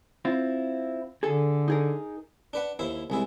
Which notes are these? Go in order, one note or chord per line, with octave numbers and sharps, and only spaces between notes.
C4 E4 F4
D3 G#4 A4
D#4 G#4 A#4
D4 B4 F#5
D#2 E4 C5
C2 G#3 E4